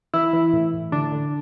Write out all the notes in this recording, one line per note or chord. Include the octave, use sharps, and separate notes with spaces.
E3 E4
E3
A2
A2
D3 D4
D3